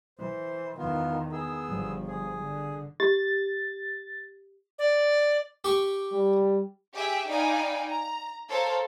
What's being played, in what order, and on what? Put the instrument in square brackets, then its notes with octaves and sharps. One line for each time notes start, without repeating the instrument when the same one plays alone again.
[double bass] E3 [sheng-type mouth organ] C5
[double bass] E2 D#3 [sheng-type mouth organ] B3 F4
[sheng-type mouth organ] B3 G#4 E6
[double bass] G1 F3
[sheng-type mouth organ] G#4
[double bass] D3
[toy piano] G4 [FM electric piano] A6
[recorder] D5
[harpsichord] G4 C#6
[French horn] G3
[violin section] G4 G#4 E5 G5
D#4 D5 F5 G5 G#5 B5
A#5
A4 A#4 C5 C#5 F5 A5